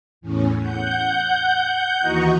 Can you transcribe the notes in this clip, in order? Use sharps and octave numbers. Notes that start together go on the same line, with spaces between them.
E2 A2 C#4
F#5 G6
D#2 E3 F#4 D#5 A#5 C#6